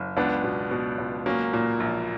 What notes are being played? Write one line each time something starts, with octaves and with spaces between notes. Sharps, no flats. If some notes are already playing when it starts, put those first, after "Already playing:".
Already playing: F#1
C#2 B3 D4
B2
B2
C#2
F#3 A#3 C#4
A#2
A#1